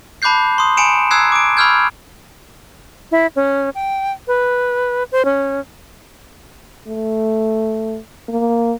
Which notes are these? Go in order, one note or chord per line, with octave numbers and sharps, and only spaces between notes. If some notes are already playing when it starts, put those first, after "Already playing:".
A5 B5 D6 F#6 G6 C7
C6 D#6
G#5 B5 C#7 D7 E7
A#5 D#6 E6 F#6 G#6 C7
D6 D7
B5 C#6 E6 F6 G6 G#6
E4
C#4
G5
B4
C5
C#4
A3
A#3